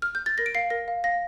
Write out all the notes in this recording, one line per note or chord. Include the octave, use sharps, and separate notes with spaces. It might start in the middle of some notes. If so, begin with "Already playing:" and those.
F6
G6
A6
A#4 A#6
D7
F5 C7
A#4 A#6
F5
F5 A#6